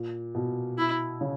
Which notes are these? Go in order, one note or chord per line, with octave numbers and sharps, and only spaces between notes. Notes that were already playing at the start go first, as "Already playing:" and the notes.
Already playing: A#2
B2
E4
C#3